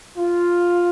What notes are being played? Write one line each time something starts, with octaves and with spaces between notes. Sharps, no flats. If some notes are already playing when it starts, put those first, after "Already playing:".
F4